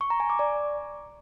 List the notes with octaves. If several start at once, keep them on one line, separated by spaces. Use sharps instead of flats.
C#6
A#5
G#5
D6
D5